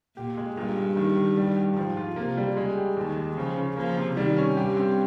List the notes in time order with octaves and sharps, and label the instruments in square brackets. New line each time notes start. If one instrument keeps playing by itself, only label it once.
[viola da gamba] A#2 [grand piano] G4
[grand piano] G#3
[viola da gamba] G2 [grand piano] A#2
[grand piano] A#2
D#3
D#3
G3
G4
[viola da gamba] G#2 [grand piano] F3
[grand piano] F4
[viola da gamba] C3 [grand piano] A#3
[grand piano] G3
[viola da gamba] C#3 [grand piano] G#3
[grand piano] G4
[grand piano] D#2 [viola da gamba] D#3
[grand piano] G#3
[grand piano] C#3 [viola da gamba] F3
[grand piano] C#3
[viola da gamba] F3 [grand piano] A#3
[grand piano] C3
[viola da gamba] D#3 [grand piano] G3
[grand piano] C#4
[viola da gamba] G2 [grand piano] G4
[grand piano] C4